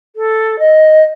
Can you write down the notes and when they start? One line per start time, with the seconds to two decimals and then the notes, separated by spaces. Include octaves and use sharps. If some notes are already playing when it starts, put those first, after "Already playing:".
0.16 A4
0.59 D#5